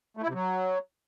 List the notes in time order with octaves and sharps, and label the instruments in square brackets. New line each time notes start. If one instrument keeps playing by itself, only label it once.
[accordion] A3
E4
C3
F#3